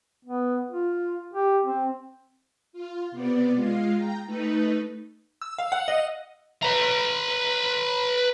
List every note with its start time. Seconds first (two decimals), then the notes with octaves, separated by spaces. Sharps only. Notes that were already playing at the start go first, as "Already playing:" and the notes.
0.25 B3
0.71 F4
1.33 G4
1.64 C4
2.73 F4
3.12 C3 B3 D5
3.55 G#3 F4 F5
3.95 G5 A#5
4.26 A3 D#4 B4
5.42 E6
5.58 F5
5.72 F#5
5.88 D#5
6.63 B4 A#5